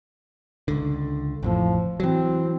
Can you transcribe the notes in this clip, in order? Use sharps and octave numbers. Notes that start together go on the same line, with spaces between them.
C#2 D3
A1 F2 A2 F3
E3 F#3 C4